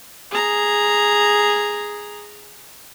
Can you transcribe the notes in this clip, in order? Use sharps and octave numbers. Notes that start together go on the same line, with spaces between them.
G#4 A#5